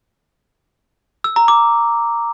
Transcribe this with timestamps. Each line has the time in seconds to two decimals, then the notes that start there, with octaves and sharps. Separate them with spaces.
1.24 E6
1.36 A#5
1.48 D6